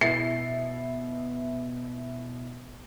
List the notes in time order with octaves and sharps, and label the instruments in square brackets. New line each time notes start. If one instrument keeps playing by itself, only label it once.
[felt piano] B2 B3 E4 E5 A6 C7